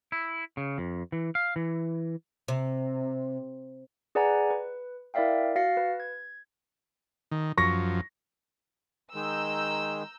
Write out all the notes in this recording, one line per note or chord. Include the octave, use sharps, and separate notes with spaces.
E4
C#3
F2
E3
F5
E3
C3
G#4 B4 D5 F#5 G#5 A#5
B4
E4 A#4 D5 E5 F5 G5
F#4 F5 A6 A#6 C7 C#7
B4
G#6
D#3
F#2 F3 C#6 A#6
D#3 G#3 A#5 E6 G6